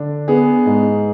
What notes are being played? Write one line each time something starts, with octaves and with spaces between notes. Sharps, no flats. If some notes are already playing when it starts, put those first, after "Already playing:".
Already playing: D3 D4
B3 G#4
G#2